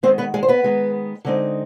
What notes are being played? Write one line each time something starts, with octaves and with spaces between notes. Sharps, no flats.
D#3 G#3 B3 C4 C5
B3 B4
G#3 G#4
C5
B3 B4
D#3 G#3 B3
D3 G#3 C4 D#4